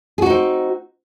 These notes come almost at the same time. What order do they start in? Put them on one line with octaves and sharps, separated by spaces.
G#4 F#4 D#4 C4